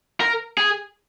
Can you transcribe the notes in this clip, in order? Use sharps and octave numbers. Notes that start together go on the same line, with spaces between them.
A#4
G#4